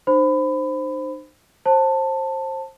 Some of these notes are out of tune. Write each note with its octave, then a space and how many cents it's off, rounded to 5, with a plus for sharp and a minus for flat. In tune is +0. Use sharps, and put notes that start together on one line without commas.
D#4 -45 C5 +0 B5 +25
C5 +25 A5 +10